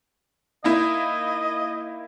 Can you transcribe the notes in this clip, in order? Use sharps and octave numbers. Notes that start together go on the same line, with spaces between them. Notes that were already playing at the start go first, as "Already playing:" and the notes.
A#3 D#4 E4 D#5